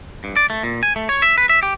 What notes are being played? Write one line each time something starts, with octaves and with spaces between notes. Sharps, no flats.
G2
D5
A3
A#2
G#5
A3
C#5
E5
B4
E5
G4